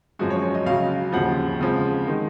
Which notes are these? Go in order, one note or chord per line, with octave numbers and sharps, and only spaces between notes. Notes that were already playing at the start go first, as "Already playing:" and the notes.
F#2 F3 G#3 F#4
C#5
C#5
D#5
C#2 C#3 F#3 F5
D#2 C#3 F3 F#5
F2 C#3 F3 G#3
D#3 G#3